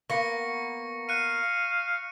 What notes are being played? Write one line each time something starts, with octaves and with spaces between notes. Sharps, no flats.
A#3 B3 C#6 A#6 C#7
F5 F#6 C#7 D#7